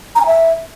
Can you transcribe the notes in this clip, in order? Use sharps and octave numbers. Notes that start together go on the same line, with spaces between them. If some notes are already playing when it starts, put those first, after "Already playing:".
A#5
G#5
E5